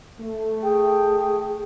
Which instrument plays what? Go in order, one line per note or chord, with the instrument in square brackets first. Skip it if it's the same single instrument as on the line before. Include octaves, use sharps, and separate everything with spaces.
[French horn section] A3
[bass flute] G#4 [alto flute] G5